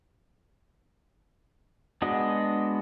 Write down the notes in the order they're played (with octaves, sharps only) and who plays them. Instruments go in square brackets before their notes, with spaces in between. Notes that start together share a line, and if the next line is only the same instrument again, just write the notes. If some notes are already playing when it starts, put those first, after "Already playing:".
[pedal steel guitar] G#3 B3 D4 F#4 D#5